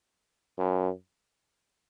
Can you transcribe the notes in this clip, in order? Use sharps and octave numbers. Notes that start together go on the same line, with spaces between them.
F#2